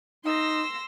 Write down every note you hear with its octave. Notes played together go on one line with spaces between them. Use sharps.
D#4 C6 E6 A#6